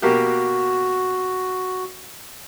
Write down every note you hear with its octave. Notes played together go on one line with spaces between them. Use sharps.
B2 A#3 F#4 G4